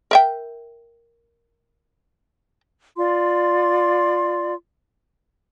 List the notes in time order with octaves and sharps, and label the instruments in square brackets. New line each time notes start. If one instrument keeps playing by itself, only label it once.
[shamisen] A#4 E5 G5
[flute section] F4 D5 C6